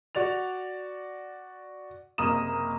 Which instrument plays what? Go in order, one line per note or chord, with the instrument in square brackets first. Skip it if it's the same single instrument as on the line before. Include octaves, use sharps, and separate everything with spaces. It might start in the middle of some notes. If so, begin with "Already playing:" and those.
[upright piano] F#4 D5 A6 F7
F#1 C3 A#3 A#5 D#6 E7